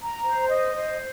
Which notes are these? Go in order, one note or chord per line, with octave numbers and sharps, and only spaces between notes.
A#5
C5
D#5
C5